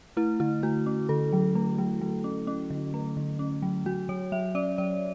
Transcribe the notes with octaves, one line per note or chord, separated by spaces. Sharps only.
A3 E4
D3 E4
A3 F#4
C#4
D3 A4
F#3
A3
F#3
F#3
C#4
C#4
D3
A3
D3
C#4
F#3
F#3 F#4
F#3 C#5
F#3 E5
C#4 D5
F#3 D5